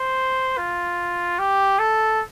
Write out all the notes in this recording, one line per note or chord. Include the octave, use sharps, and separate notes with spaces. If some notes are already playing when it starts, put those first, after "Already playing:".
Already playing: C5
F4
G4
A4